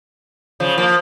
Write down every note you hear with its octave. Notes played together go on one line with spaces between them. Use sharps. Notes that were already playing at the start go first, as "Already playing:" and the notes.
C#3 F3
F3 A#3